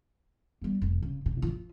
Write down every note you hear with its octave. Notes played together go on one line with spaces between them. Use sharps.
G3 B3
F1
C#3
C3
F3 F4